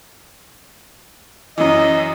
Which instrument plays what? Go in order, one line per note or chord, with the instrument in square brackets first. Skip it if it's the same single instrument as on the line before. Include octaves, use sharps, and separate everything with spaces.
[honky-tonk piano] F#2 E3 [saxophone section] D#5